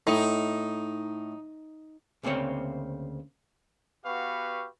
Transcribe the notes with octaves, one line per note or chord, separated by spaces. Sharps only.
A2 D#4
D2 C#3 A#3 C4 C#5
B3 F#4 G4 B4 F5 C#6